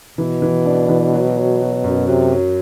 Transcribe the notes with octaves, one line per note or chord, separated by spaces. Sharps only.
B2 E3
E3
D4
E3
F#3
F#3
F#3
F#2
C3 F#3
F#3